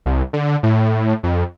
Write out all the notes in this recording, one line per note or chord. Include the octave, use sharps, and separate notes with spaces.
C2
D3
A2
F2